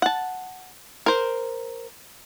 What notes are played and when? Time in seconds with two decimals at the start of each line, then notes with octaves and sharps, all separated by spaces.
0.02 F#5 A5
1.06 A#4 C5